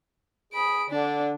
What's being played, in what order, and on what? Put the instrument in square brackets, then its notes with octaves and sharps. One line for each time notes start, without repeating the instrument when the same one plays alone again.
[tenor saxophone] G#4 [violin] B5 D7
[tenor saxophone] D3 [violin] D4